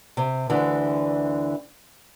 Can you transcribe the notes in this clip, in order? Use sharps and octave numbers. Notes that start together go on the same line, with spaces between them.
C3
D2 D3 E3